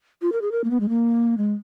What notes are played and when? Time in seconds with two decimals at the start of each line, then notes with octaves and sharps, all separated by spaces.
0.22 F4
0.32 A#4
0.42 G#4
0.52 A#4
0.64 A#3
0.71 B3
0.80 G#3
0.89 A#3
1.38 G#3